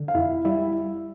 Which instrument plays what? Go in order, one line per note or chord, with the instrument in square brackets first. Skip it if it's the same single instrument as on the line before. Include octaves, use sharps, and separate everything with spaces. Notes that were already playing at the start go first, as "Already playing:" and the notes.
Already playing: [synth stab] D3
[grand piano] F5
[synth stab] F2 [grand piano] E4 E5
[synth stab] G3 [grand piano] E4 E5